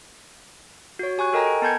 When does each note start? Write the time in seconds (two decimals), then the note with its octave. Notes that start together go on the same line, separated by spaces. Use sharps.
0.99 F#4 C#5
1.18 G4 G#5 C#6 F#6
1.33 A4 A#4 D#5 G5 G#5 A#5
1.46 D7
1.62 B3 A5 B5 G6 G#6 C#7